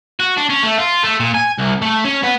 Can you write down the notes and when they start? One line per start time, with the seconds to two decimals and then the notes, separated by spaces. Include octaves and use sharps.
0.20 F#4
0.37 D4
0.49 C#4
0.63 A3
0.78 F4
1.03 A3
1.20 A#2
1.34 G#5
1.58 C2
1.82 A3
2.05 C#4
2.23 B3